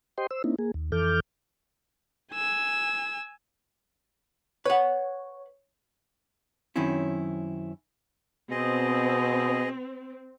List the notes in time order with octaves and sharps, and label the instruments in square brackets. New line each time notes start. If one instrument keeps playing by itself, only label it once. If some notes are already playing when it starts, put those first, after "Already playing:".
[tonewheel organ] G4 C5 D#5 G5 C6
C5 E6
A#3 C4 C#4 D#4 E4
A#3 G#4
D#2
F2 E3 A4 D6 F6 G6
[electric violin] G#5 E6
[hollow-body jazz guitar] B4 F#5 [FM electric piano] C#5
[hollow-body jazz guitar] F#2 D#3 F#3 C4 C#4 E4
[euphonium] B2 [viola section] C4 [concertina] G#4 D#5